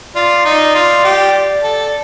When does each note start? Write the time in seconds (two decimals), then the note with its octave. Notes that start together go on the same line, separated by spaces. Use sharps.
0.15 F4 D5
0.45 D#4
0.74 F4
1.04 G4
1.63 A4